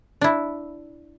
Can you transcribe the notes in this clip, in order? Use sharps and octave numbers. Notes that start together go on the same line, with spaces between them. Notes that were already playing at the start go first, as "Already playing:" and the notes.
D4 E4